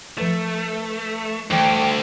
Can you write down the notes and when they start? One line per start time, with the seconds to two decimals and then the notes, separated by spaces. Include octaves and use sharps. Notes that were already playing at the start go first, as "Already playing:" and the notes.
0.18 F3 A3 B4 A6
1.51 D2 E3 G3 G5 D6